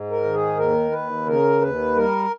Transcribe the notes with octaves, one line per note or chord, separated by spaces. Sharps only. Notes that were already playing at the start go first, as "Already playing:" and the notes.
Already playing: G#2
A#4
D#3
G#4
D#2 A#4
D#2 B4
C#3 A#4
D#2 B4
G3 A#4